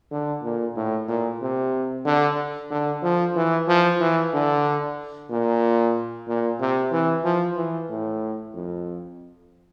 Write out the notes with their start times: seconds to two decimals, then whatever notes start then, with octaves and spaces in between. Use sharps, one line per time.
0.11 D3
0.43 A#2
0.76 A2
1.08 A#2
1.41 C3
2.05 D3
2.71 D3
3.03 F3
3.36 E3
3.68 F3
4.00 E3
4.33 D3
5.30 A#2
6.28 A#2
6.60 C3
6.92 E3
7.24 F3
7.57 E3
7.89 A2
8.55 F2